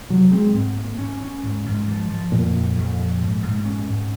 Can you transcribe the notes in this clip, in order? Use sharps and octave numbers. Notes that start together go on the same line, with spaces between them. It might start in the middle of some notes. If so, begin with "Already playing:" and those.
C3 F#3
G#3 C4
G#2
A#3
C#4
C#4
G#2
G#2
F3
F3
F2 A#2
F2
F2
F3
G#2
G#2
C#4
G#2